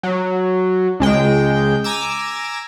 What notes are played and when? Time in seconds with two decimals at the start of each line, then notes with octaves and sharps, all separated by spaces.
0.03 F#3
1.00 C#2 G#3 G5
1.84 G#5 A#5 D6 E6